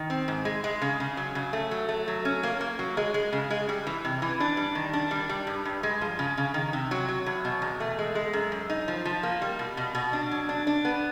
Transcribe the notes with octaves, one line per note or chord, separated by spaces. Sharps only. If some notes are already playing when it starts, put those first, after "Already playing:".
Already playing: D#3
C4
G#2
G#3
G#3
C#3
C#3
F#3
C#3
A3
F#3
A3
F#3
C#4
A#3
A#3
F#3
G#3
G#3
C#3
G#3
G3
E3
C3
E3
D4
G3
D#3
D4
G3
G3
G2
G2
G#3
F3
C#3
C#3
D#3
C3
F#3
F#3
E2
B2
E2
A3
G#3
G#3
F#2
F#2
D#4
F3
F3
A#3
G3
B2
B2
B2
D4
F#3
D4
D4
B3